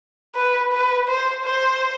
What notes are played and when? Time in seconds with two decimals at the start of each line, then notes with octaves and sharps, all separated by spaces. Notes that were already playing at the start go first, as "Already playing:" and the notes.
0.36 B4
0.72 B4
1.08 C5
1.45 C5